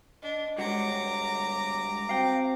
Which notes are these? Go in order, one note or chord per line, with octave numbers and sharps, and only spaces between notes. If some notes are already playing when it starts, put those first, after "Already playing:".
D4 D#5
G2 D3 G#3 F#4 C#5 A#5 D6
C4 F#4 C5 F5 G5